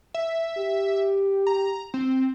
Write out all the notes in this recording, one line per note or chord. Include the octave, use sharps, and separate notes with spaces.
E5
G4
A#5
C4